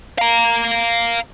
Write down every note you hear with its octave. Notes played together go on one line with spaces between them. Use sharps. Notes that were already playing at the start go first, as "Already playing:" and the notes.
F5 A#5